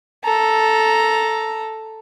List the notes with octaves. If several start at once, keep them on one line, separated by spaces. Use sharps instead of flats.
A4 A#5